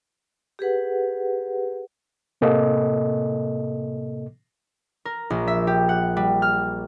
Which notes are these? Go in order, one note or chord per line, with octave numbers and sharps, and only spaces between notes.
G4 G#4 B4 F#5
A2 C3 A#3 A4 D#5
A#4
A#1
E5
G4
F#5
G3
F6